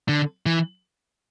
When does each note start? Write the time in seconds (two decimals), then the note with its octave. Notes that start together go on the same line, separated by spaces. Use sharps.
0.09 D3
0.46 E3